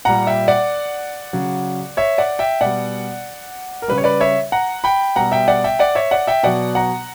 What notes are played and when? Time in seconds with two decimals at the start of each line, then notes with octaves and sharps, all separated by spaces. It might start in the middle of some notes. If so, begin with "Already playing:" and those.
0.05 A#2 G3 F#5 A#5
0.27 E5 G5
0.48 D5 F#5
1.33 C#3 F#3
1.97 C#5 E5
2.18 D5 F#5
2.39 E5 G5
2.61 B2 G3 D5 F#5
3.82 A#4
3.88 C#3 G3 B4
3.98 C#5
4.04 B4 D5
4.21 C#5 E5
4.52 F#5 A#5
4.84 G5 B5
5.16 B2 G3 F#5 A#5
5.32 E5 G5
5.48 D5 F#5
5.64 E5 G5
5.79 D5 F#5
5.95 C#5 E5
6.11 D5 F#5
6.27 E5 G5
6.43 B2 F#3 D5 F#5
6.75 F#5 A#5